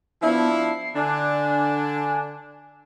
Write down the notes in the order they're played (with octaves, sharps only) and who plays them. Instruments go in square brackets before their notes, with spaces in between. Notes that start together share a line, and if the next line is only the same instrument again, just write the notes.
[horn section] F3 D4 E4 [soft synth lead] B3
[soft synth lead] C7
[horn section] D3 D4 [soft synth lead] G#5